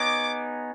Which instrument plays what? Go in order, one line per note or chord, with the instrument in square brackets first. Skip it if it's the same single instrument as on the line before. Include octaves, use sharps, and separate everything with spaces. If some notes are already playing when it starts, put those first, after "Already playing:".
Already playing: [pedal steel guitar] B3 D#4 G#4 C#5 [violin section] D6